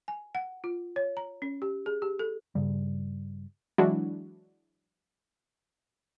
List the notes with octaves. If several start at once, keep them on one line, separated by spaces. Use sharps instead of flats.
G#5
F#5
F4
C#5
A#5
C#4
G4
G#4
G4
A4
G2 C#3 G3
E3 F#3 G#3 D4 E4 F#4